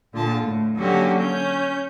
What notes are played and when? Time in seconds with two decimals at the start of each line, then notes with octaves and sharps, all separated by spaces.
0.13 A#2 D3 F4 A5
0.42 A2
0.76 D3 F#3 A#3 C#4 F#4 G4
1.18 C#4 G6